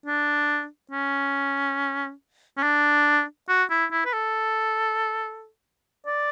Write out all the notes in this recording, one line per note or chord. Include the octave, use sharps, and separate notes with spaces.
D4
C#4
C#4
D4
F#4
E4
E4
B4
A4
D5